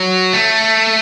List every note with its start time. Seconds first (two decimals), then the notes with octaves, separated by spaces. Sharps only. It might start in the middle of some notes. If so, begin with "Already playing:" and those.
Already playing: F#3
0.33 A3